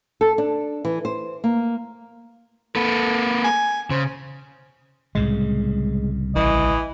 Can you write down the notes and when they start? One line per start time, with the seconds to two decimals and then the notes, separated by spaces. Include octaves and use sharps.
0.21 A4
0.38 D4
0.85 E3
1.05 C5
1.44 A#3
2.76 A#3 A4 B4
3.44 G#5
3.90 C#3 C5
5.15 C2 A2 C#3 G#3
6.36 A1 E3 D#5